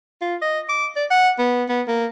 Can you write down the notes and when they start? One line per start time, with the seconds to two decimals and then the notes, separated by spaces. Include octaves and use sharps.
0.22 F4
0.42 D#5
0.69 D6
0.96 D5
1.11 F#5
1.39 B3
1.69 B3
1.88 A#3